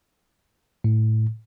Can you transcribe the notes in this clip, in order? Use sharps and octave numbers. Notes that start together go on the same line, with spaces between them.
A2